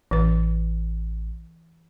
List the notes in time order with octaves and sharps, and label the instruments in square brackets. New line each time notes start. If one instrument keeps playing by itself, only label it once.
[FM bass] A1 [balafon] E3 B4